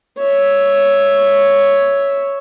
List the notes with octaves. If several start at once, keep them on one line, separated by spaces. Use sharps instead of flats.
C#5 E5